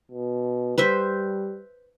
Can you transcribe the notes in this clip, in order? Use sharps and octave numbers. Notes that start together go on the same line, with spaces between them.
B2
G3 B4 C5 E5